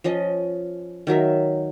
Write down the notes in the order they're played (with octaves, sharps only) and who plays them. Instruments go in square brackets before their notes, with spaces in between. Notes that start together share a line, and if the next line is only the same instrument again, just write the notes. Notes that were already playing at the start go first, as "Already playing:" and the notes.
[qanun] F3 C#4 D#5
D#3 F#3 A#4 E5